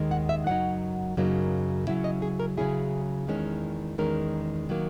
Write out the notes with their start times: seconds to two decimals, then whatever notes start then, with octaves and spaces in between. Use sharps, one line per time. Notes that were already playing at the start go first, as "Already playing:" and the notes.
Already playing: D#2 D#3 G#3
0.11 F#5
0.29 E5
0.46 F#2 C#3 F#3 D#4 F#5
1.17 F#2 C#3 F#3 A#3 D#4
1.88 C#3 F#3 C#4 E4 E5
2.04 D#5
2.22 G#4
2.40 A#4
2.57 C#3 F#3 C#4 E4 G#4
3.27 E2 D#3 G#3 C#4
3.98 E2 D#3 G#3 C#4 A#4
4.69 D#3 F#3 A#3